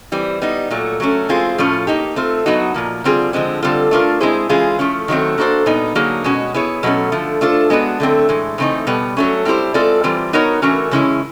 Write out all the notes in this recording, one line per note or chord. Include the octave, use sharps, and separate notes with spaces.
E3 G3 C4
G3 B3 D#4
A#2 F#3 A3
F#3 A3 C#4
E3 G#3 C4 F4 G#4
A2 F3 A3 C#4 F4
A#3 D#4 G4
A3 C4 F4
F#3 B3 D#4 F#4
A#2 F3 A#3
D3 G3 C4 F4 G#4
D3 F3 G#3 C4
D3 G3 C4 F4 A4
A3 D4 F4 A#4
G#3 C4 E4 G#4 C5
E3 G#3 C#4 F4 G#4
F3 A3 C#4
D#3 F#3 A3 C4
A#3 D4 F#4 A4 C5
A#2 G3 B3 D#4
D3 F#3 A#3 D#4 G#4
B2 G#3 C#4 F#4
B3 E4 G#4 C#5
B2 F#3 A3 C#4
D3 F3 A3
A3 D4 F4 A4 C5
G#3 B3 D4 F#4 B4
D3 F#3 A3 C4
A2 E3 G#3
C#3 E3 A3 C4 D#4
B2 G3 B3
F#3 A3 C#4
G3 C4 E4 G4 C5
G#3 C4 F4 A4 D5
E3 G3 C4 F4
B3 D#4 F#4 A#4 C#5
E3 A3 C#4 F#4 A#4
C#3 E3 G#3 C#4 E4